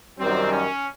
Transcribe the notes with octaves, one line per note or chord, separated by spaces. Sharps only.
F#2 D#3 G3 C4
C#4